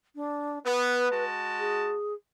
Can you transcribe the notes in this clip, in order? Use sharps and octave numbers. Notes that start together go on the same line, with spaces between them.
D4
B3 B4
G#3 F#4 A5
G#4